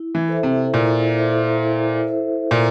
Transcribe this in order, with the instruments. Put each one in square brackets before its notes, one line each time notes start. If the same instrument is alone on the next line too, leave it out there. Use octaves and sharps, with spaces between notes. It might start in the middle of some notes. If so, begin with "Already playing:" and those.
Already playing: [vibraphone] E4
[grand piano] E3
[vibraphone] A4 C5 E5
[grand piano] C3
[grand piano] A#2 [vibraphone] E4
[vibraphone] A4 C5 E5
E4
A4 C5 E5
[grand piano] A#2 [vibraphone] E4